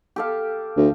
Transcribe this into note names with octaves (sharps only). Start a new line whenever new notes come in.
G4 A4 F5
D2